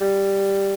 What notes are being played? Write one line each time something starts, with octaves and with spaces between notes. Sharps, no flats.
G3